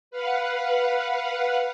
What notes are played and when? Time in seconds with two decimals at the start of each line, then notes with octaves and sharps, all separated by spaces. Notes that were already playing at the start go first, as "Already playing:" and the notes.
0.11 B4 F5 F#5